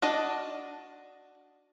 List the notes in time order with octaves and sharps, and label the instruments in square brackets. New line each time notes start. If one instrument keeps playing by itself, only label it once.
[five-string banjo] D4 F#4 D5 D#5